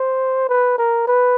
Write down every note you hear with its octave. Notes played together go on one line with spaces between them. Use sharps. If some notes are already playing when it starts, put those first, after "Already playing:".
Already playing: C5
B4
A#4
B4